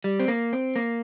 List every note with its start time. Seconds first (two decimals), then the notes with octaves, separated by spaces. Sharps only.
0.04 G3
0.20 C4
0.28 A#3
0.53 C4
0.76 A#3